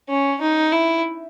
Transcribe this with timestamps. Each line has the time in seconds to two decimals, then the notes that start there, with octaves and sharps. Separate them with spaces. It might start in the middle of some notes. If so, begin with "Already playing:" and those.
0.09 C#4
0.41 D#4
0.72 E4